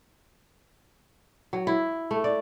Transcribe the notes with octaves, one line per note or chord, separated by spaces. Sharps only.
F#3
E4
A3
D5